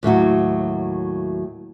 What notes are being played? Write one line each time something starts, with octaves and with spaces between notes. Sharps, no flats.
D#2 A2 F#3 F#4